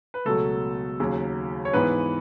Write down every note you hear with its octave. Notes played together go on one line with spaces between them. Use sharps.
B4
C#2 B2 F#3 A3 A4
D#2 C#3 F#3
C#5
G#2 E3 B3 B4